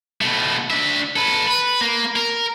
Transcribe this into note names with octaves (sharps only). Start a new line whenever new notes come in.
B2 A3
D4 E5
A4 B4
B4
A#3
A#4